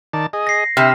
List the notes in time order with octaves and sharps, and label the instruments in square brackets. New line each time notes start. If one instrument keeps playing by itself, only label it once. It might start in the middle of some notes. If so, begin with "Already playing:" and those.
[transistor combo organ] D#3 D5 A5
G#4 D#5
[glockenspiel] A#6 C7
[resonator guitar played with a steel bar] C3 [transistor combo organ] B5 E6 [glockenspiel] F6